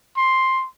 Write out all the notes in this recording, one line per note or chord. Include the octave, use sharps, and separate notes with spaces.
C6